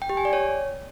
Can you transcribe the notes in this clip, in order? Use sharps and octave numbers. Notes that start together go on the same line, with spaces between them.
G5
G4
G#5
D5
C#5